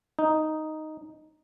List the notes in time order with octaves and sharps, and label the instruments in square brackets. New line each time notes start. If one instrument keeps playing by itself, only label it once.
[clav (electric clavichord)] D#4